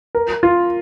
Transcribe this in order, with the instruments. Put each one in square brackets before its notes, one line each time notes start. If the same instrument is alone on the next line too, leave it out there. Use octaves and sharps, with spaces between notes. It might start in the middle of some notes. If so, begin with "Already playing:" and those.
[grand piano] A#4
F4